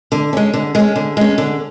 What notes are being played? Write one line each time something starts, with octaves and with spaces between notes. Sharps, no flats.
D3
G#3 C#4
D3
G#3 C#4
D3
G#3 C#4
D3